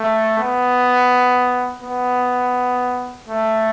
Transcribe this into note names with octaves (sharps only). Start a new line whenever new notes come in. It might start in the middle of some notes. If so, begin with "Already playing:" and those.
Already playing: A3
B3
B3
A3